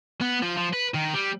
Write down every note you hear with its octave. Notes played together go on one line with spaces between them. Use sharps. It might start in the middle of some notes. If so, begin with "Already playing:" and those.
B3
F3
F3
B4
D#3
G3